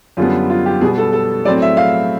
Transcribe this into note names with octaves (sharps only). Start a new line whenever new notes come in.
F#2 D3 G3 B3 F4
F4
G4
B2 G3 B3 G#4
A4
A4
A2 F#3 A3 C4 D5
E5
F5